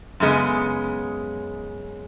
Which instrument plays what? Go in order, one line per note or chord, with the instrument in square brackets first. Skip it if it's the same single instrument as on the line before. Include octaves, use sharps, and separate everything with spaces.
[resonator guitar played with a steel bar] F#2 C#3 G#3 B3